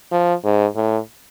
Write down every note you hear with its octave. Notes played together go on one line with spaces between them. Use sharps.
F3
G#2
A2